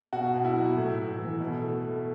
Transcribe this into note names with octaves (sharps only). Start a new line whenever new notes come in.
B2 F#4
B2
E4
F#3
A2
A2
E3
B2
A3
A3